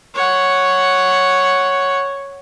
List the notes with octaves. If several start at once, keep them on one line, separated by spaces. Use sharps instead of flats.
C#5 F#5